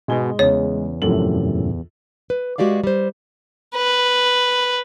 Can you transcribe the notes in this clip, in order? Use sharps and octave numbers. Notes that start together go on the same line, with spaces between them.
G#2 B2 G#3 G#5 G7
E2 C#3 C#5
A#1 F#2 A2 C3 A4 F#7
B4
G#3 F#4 G4 D5 F5
G3 C5
B4